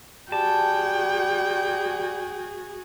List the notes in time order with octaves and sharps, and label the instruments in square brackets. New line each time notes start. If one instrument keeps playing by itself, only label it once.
[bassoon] G3 [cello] F#4 G#4 [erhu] G5 [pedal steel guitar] A5